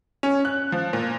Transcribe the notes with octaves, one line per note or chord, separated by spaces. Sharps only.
C#4
F#6
F3
A#2